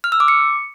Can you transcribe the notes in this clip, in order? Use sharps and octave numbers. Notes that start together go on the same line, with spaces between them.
F6
E6
D6
C#7